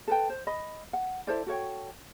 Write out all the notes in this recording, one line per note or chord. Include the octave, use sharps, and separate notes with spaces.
A4 B4 G5
C5
D#5 B5
F#5
E4 A4 C5 D5
F#4 A4 C#5 G5